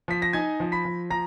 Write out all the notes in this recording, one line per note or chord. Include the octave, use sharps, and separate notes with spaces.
F3 B6
A#6
D#4 G#5 G#6
F3
B5 B6
F3
F3 A#5 A#6